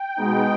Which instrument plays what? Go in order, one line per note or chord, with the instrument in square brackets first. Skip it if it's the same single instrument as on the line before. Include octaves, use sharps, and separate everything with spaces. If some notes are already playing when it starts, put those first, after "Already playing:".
Already playing: [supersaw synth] G5
B2 G#3 B3 D#4